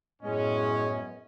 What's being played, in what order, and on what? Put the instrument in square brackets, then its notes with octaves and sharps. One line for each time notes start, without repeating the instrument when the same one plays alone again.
[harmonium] F#2 B3 D#5 [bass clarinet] A2 [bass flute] G#3 [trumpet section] C#4